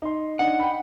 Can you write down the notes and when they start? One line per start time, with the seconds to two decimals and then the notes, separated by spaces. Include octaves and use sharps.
0.02 D#4 C6
0.39 D4 D#4 D#5 F#5
0.60 G5 B5